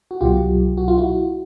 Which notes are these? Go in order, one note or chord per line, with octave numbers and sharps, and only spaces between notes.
F#4
C2 B2 F#3 F4 G4
F#4
F4
E4 F#4